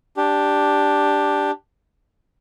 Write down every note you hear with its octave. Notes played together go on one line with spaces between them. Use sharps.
D4 G4